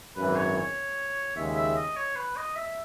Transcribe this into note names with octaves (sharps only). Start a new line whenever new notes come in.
G#1 F#2 E3 B4
C#5
C#5
D#2 C#3 G#3 E5
E5
D#5
C#5
B4
D#5
E5